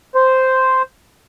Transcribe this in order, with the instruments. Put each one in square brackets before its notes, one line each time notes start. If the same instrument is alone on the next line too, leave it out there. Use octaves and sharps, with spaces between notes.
[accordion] C5